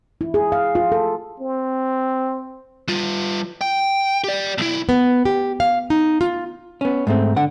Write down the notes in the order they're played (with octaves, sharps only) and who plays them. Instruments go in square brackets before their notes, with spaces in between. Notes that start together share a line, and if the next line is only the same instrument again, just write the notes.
[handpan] E4
G#4
F5
F4
A4
[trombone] C4
[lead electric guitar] G3 F4
G5
G4 D5
B1 E4
[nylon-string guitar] B3
G4
F5
D#4
F4
[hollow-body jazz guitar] B3 C#4
G#2 A3 C4
D3 F#5